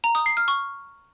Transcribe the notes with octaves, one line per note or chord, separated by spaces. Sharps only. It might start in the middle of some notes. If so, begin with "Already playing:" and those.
A#5
D#6
C7
F6
C#6